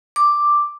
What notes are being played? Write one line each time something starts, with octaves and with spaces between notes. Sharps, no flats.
D6